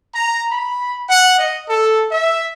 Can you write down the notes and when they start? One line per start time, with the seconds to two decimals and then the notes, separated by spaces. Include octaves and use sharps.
0.14 A#5
0.51 B5
1.09 F#5
1.38 D#5
1.68 A4
2.11 E5